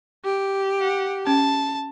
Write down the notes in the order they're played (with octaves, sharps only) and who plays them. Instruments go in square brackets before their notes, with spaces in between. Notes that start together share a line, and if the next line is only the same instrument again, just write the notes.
[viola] G4
[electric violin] F#5
[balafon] C#4 [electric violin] A5